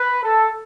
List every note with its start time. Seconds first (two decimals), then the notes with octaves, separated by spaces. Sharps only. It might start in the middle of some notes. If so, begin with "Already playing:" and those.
Already playing: B4
0.23 A4